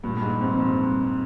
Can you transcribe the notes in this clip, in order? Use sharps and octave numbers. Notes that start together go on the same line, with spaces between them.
G2 A#2
G2
G#2
G#2 C4
F2
G2